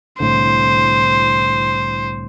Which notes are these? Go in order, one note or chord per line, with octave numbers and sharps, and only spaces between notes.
C2 A2 D3 C5